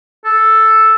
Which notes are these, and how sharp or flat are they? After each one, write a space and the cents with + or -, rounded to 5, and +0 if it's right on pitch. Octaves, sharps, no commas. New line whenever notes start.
A4 +0